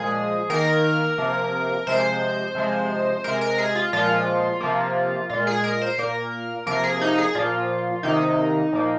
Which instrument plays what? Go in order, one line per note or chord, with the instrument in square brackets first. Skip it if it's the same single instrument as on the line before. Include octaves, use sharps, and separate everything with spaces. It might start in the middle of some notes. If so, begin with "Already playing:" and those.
Already playing: [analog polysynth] A#2 F3 G#3 G#4
D#3 A#3 A#4
C3 F3 A#3
C3 F3 G#3 C5
C3 F3 G#3
C3 G#3 A#4
A#4
G#4
F4
A#2 F3 G#3 F4
C3 F3 A#3
A#2 G#3 F4
G#4
A#4
C5
A#2 A#3 A#4
C3 F3 A#3 A#4
G#4
D#4
G#4
A#2 F3 A#3 F4
C3 D#3 A#3 D#4
A#2 F3 A#3